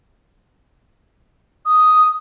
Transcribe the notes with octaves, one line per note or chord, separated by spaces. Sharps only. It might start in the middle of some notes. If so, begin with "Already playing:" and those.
D#6